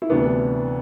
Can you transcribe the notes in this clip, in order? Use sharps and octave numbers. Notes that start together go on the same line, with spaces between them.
E4
D2 C3 E3 B3 D4